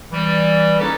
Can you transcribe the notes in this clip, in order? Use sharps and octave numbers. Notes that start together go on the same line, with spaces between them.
E3 G3
A#3 C#4 D#4 E4 A4 B4